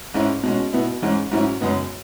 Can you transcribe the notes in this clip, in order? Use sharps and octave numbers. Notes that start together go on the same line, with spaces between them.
G#2 G#3 C#4 E4
B2 G#3 C#4
B2 B3 E4
G#2 E3 G#3 C#4
G#2 F#3 C#4 E4
F#2 C#3 G#3 B3